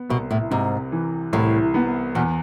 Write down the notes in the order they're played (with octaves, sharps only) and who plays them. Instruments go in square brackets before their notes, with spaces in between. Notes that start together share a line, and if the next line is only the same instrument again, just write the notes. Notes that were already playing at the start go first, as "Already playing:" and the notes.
Already playing: [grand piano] B3
[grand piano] C2 [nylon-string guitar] B2
[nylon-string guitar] A2
[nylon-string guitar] G#2 [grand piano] C3
[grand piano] E3
[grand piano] C2 [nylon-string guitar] A2
[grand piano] B3
[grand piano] E2 [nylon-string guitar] B2